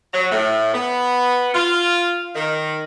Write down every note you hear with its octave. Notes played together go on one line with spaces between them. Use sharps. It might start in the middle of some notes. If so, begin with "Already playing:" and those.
F#3
A2
B3
F4
D#3